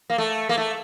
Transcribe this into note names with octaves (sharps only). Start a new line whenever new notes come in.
A#3
A3
A#3
A3